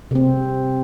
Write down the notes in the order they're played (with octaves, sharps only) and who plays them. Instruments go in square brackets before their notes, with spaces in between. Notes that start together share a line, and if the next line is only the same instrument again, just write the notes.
[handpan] C3 C4